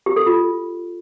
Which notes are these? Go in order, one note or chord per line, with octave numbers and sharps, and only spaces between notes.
G4
A4
F4